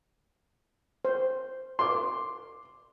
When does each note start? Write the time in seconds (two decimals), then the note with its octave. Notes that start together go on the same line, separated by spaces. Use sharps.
1.05 C5
1.79 C6 D6